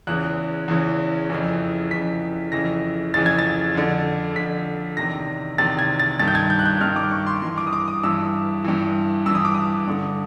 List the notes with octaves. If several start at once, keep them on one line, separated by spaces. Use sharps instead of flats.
E2 C#3 E3 F#6
E2 C#3 E3
F2 C#3 E3
F2 C#3 E3 B6
F2 C#3 E3 A#6
F2 C#3 E3 A6
G#6
A6
F2 D3
F2 D3 B6
E2 C3 D#3 A#6
E2 C3 D#3 A6
G#6
A6
G2 D#3 A6
G6
G#6
G6
F#6
G6
G2 D#3 F6
D6
C#6
C6
G2 E3 C6
D6
D#6
D6
D#6
G2 E3 E6
G2 E3
G2 E3 E6
D#6
D6
D#6
G2 D3